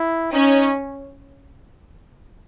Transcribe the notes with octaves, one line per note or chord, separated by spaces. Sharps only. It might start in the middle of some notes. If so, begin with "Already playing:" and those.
Already playing: E4
C#4 D#4